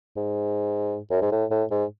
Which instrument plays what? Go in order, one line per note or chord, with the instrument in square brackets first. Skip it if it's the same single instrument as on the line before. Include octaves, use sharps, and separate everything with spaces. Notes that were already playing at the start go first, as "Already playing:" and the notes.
[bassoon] G#2
F#2
G#2
A2
A2
G#2